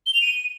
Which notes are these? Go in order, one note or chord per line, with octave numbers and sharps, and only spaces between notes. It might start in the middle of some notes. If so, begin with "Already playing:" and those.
G7
F7
D#7